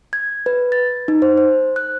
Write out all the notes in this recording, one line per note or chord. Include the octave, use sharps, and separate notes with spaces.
G#6
B4
A6
D#4
C5
C5
F#6